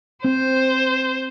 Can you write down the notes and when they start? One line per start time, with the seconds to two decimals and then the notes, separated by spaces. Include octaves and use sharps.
0.24 C4 C5